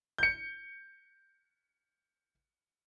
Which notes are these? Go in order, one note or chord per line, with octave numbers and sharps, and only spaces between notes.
G6 C#7